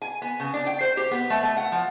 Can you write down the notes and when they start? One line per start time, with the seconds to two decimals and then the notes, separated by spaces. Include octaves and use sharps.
0.02 G#5
0.22 B3
0.40 C#3
0.54 D4
0.67 G5
0.81 C5
0.97 G4
1.11 B3
1.30 A3
1.43 A3
1.57 F#5
1.72 F3